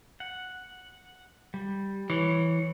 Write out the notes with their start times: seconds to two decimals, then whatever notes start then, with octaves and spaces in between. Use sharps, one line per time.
0.20 F#5
1.54 G3
2.10 E3 C#5